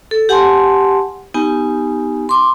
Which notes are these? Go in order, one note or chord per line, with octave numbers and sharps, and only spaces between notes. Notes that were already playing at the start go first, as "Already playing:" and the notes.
A4
G4 F#5 G#5 A5 C6
B3 D#4 G4 G#5
C6 D6